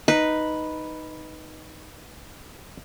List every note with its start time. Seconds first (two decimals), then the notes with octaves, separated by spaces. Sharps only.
0.08 D#4 B4